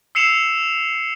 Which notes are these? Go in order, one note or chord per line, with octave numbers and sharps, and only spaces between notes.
E6 C7 C#7 E7 F7